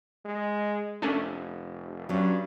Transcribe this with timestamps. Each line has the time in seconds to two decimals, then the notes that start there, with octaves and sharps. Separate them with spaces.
0.25 G#3
1.02 F1 A3 C#4 D4
2.09 G2 F#3 C#4